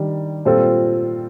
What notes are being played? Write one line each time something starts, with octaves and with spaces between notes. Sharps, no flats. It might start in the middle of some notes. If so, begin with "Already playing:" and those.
Already playing: D#3 G3 D4
A#2 G3 C4 F4 A4